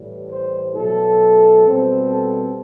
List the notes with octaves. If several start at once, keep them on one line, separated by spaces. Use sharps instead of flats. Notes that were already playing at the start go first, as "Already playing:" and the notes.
Already playing: A2 E3 G3
C5
B2 F#3 A3 A4
B2 G3 C4
A4